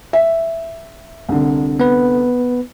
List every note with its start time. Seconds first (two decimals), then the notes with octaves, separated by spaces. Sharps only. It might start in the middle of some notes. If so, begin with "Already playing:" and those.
0.13 E5
1.29 C2 D3
1.80 B3 B4